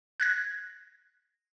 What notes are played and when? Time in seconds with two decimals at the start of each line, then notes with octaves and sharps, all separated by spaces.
0.20 F#6 G#6 A#6